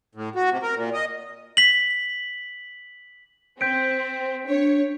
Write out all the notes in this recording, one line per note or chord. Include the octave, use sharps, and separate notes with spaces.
A2
F#4
C3
A#4
A#2
D#5
B6 F#7
C4 G6 B6 D7
D4 C#5